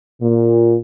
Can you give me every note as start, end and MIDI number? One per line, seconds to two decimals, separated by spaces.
0.22 0.76 46